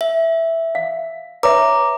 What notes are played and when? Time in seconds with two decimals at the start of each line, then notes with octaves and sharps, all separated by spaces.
0.01 E5
0.75 F5
1.43 B4 C#5 E5 A#5 D6